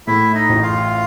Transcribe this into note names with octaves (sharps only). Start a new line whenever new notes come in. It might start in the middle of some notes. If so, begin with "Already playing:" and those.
A2 E4 E5
D#4 D#5
A1
F4 F5